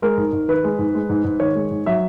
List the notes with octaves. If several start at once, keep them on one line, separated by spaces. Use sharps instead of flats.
G#3 A#4
G#2
G#2
D#3 B4
G#3
G#2
G#3
G#2
G#2
D#3 C#5
G#3
G#2
F#3 E5